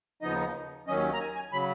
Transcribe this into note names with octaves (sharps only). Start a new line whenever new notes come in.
D#2 C#3 F3 B3 D#4 D#5
D#2 D#3 F#3 C#4 D#5
A#5
G#5
G#5
C#3 F#3 B5